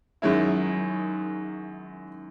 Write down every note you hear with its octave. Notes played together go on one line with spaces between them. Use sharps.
F#2 D#3 G#3 C#4 E4